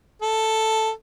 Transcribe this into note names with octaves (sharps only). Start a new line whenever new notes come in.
A4